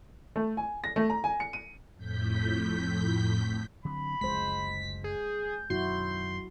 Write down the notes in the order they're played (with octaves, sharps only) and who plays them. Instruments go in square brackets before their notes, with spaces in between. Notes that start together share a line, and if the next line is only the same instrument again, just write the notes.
[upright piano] A3
G#5
A#6
A3
A#5
G#5
C#7
D#7
[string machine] F2 A2 G6 B6
[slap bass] D3 F#3 C4 [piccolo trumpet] B5
[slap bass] F#1 D2 F3 [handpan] G#3 C5 [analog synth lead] B6
[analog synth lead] G#4 [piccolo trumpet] G6
[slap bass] F#2 B2 D#3 [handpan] F#3 E4 F#4 [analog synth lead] C6